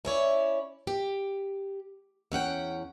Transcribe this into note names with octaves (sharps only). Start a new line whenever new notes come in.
C#4 E4 C#5 D5
G4
E2 C#4 F#5 G5